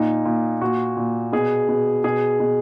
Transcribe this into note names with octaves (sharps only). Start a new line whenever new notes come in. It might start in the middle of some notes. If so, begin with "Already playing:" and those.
Already playing: A#2 D#4
A#2
A#2 F#4
A#2
B2 G#4
B2
B2 G#4
B2